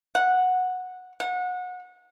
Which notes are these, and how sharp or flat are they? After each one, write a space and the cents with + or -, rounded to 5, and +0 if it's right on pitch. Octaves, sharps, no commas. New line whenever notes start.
F#5 -10
F#5 -30